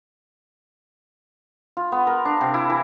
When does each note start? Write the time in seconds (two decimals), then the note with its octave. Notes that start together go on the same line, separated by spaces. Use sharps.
1.77 F4
1.92 B3
2.07 A#4
2.25 D4
2.41 C3
2.54 E4
2.70 E3